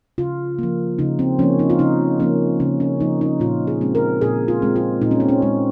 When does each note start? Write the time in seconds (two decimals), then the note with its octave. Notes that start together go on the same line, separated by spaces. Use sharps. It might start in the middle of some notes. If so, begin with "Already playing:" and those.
0.18 C#3 F4
0.59 F3 A#3
0.99 C#3 D#4
1.19 C4
1.39 F3 A#3 C#4
1.59 D#4
1.70 F4
1.79 C#3 D#4
2.20 F3 A#3 C#4
2.60 C#3 C#4
2.80 C#4
3.00 F3 A#3 D#4
3.21 D#4
3.40 A#2 F4
3.67 G#4
3.81 G#3 C4
3.95 A#4
4.21 A#2 G#4
4.48 F4
4.62 G#3 C4
4.76 F4
5.02 A#2 D#4
5.11 C#4
5.20 C4
5.29 C#4
5.42 G#3 C4